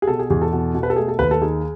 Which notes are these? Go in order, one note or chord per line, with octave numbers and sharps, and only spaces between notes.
G#4
B2 A4
G#4
E2 G#4
A4
B2
B2
B4
A4
A3 G#4
A4
D#2 B4
A4
D#3 G#4